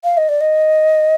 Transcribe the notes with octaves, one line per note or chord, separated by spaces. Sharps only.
F5
D#5
D5
D#5